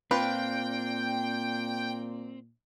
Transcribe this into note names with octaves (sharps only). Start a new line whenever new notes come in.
A#2 C4 D4 F4 B4 G5